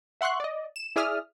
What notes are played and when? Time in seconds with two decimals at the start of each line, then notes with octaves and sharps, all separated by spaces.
0.21 E5 F#5 C6 C#6 F#6
0.40 D5 D#5
0.76 E7
0.96 E4 G#4 D5 E5 D#6 F6